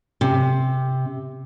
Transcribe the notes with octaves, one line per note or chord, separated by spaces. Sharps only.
C3